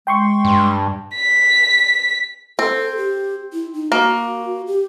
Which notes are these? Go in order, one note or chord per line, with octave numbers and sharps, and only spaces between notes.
G#3 G5 C6 C#6
G2
B6
C4 A4
G4
E4
D#4
A#3 F#4
G4